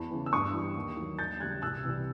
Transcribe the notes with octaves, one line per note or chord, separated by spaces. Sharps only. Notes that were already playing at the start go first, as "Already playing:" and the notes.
Already playing: E2 A5 B5
C#3 E3
E6
G2 C#6 D#6
E3 G3
D#2
D#3 F#3
D#2 G6 A6
C#3 E3 G3 F#6 G#6
C2 E6 F#6
C3 E3 G3